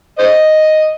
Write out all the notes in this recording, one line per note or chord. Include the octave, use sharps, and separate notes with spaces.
C5 D#5